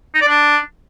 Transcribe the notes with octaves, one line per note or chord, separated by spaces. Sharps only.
D#4
D5
D4